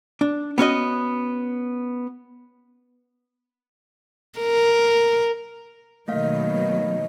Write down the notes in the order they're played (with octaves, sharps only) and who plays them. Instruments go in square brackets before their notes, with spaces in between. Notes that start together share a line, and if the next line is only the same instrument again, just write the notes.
[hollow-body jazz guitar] D4
B3 C#4 F#4 D#5
[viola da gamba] A#4
[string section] B2 D#3 F#3 [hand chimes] A3 A#3 F5 [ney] D#5